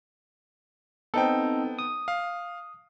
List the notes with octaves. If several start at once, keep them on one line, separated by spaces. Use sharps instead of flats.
B3 C4 D#4 A4 G5
D#6
F5